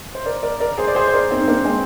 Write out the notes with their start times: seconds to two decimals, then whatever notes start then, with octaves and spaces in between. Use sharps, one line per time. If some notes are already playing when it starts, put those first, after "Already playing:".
0.15 C5
0.25 A#4 D5
0.43 A#4 D5
0.60 A#4 D5
0.78 G#4 C5
0.88 D5
0.95 G#4 C5
1.08 C5
1.13 A#4 D5
1.30 C4 D#4
1.40 D#4
1.47 A#3 D4
1.65 G#3 C4